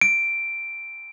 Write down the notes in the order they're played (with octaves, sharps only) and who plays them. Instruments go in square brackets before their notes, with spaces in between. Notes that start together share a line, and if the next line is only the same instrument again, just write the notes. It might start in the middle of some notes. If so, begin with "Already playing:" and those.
[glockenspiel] D7